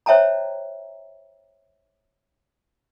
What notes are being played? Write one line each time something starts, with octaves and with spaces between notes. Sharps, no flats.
C5 C#5 E5 G5 A5 A#5